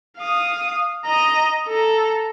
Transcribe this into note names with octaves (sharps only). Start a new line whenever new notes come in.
F5 D#6
D#5 A#5
A4 A#5